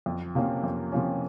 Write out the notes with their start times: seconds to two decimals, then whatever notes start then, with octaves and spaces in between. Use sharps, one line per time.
0.06 F2
0.35 C3 F3 A#3 C#4
0.64 F2
0.92 C3 F3 A#3 C#4